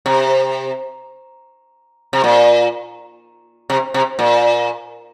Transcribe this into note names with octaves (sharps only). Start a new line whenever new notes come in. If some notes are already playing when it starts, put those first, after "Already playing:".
C3
C3
A#2
C3
C3
A#2